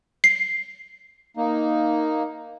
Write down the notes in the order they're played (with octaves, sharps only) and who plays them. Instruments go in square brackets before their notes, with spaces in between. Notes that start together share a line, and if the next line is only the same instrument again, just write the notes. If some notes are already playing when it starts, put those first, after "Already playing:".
[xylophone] C7
[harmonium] A#3 D#4